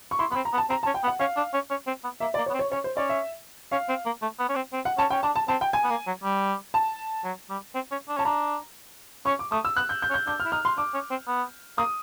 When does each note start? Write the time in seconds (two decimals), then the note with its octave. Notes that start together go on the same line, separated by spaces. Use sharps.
0.11 C#6
0.19 E4 C6
0.31 B3 B5
0.36 C4
0.45 A#5
0.53 B3
0.58 A5
0.70 C4 A#5
0.83 A5
0.87 C#4
0.94 G5
1.04 B3
1.08 F#5
1.20 C#4 F5
1.37 D4
1.54 C#4
1.71 C#4
1.87 C4
2.04 B3
2.20 A#3 E5
2.34 D5
2.38 A#3
2.46 C#5
2.50 B3
2.54 C4
2.59 C#5
2.71 C#4 C#5
2.84 C5
2.97 C#4 D5
3.09 E5
3.71 C#4 F5
3.89 C4
4.06 A#3
4.22 A3
4.39 B3
4.49 C#4
4.56 C4
4.73 C4
4.85 F#5
4.98 C#4 A5
5.10 C#4 G5
5.23 D4 A5
5.36 A5
5.48 C4 A5
5.61 G5
5.73 G#5
5.84 B3
5.90 A#3
6.07 F#3
6.24 G3
6.74 A5
7.24 F#3
7.50 G3
7.75 C4
7.92 C#4
8.09 D4
8.17 C#4 A5
8.25 D4 A#5
9.26 C#4 C#6
9.39 D6
9.52 A3 D#6
9.65 E6
9.77 B3 F#6
9.89 G6
10.02 G6
10.10 C#4
10.14 G6
10.27 D4 G6
10.40 F6
10.45 E4
10.52 D#4 F6
10.65 C6
10.77 D4 D6
10.94 C#4
11.11 C4
11.28 B3
11.78 A#3 D#6